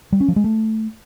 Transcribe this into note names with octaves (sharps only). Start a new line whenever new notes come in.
G3
C#4
F3
G#3
A3